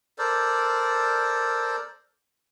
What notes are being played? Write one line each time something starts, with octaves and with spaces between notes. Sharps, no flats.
A4 A#4 C5 D5